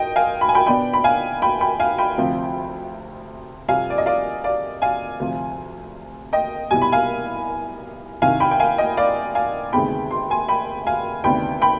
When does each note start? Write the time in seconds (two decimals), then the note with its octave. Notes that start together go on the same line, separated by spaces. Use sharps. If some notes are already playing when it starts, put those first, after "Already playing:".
Already playing: D#5 G5
0.16 F5 G#5
0.41 B5
0.49 G#5
0.55 G5 B5
0.66 B2 B3 D4 G5 B5
0.93 B5
1.04 F5 G#5
1.42 G5 B5
1.61 G5 B5
1.79 F5 G#5
1.98 G5 B5
2.17 D2 C3 F3 C4
3.69 F2 C3 G3 F5 G#5
3.90 D5
3.98 D#5
4.06 D5 F5
4.44 D5 F5
4.82 F5 G#5
5.20 D2 C3 F3
6.33 D#5 G5
6.71 C2 B2 G3 G#5
6.82 B5
6.92 F5 G#5
8.22 C2 C3 D#3 F5 G#5
8.40 G5 B5
8.51 G5
8.60 F5 G#5
8.78 D#5 G5
8.97 D5 F5
9.35 F5 G#5
9.73 D2 C3 D#3 G#3 B3 G5 B5
10.11 C6
10.30 G#5 C6
10.49 G5 B5
10.87 F5 G#5
11.24 D2 C3 D#3 B3 D4 G5 B5
11.62 G5 B5